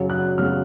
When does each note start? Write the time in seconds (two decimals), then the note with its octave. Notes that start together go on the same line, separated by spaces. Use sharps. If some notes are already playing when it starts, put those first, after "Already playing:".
Already playing: F#2 C#3 F#3
0.10 F#6
0.38 F#2 C#3 F#3 F6